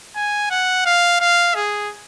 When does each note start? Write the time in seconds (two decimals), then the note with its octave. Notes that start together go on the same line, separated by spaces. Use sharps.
0.16 G#5
0.50 F#5
0.85 F5
1.20 F5
1.55 G#4